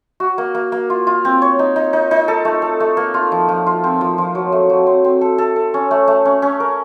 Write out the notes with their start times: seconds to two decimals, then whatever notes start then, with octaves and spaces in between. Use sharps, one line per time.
0.20 F#4
0.38 A#3
0.55 A#3
0.72 A#3
0.90 F4
1.07 F4
1.25 C4
1.42 C#5
1.59 D#4
1.76 D#4
1.93 D#4
2.11 D#4
2.28 A4
2.45 A3
2.62 A4
2.80 A3
2.97 A#3
3.14 F4
3.32 F3
3.49 F3
3.66 F4
3.84 C4
4.01 F3
4.18 F3
4.35 F#3
4.52 A3
4.70 F#3
4.87 C4
5.04 C4
5.21 A4
5.38 A4
5.56 A4
5.74 C#4
5.91 A3
6.08 A3
6.25 C#4
6.42 C#4
6.60 A#4